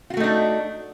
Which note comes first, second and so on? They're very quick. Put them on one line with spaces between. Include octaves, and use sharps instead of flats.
F4 F#4 A3 D#4 D4